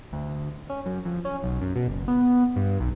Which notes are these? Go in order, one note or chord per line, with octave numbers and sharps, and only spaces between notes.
D2
C#4
F#2
F2
C#4
B1
F#2
B2
F#1
B3
G2
B1